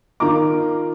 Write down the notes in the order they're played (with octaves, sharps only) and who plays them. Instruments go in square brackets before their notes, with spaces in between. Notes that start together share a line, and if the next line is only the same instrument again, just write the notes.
[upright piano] D#3 F4 A#5 D6